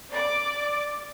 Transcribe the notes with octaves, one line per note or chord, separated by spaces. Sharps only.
D5 D6